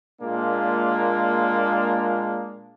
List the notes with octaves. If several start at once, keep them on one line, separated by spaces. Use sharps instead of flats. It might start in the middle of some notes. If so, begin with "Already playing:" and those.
A#2 G#3 A#3 D4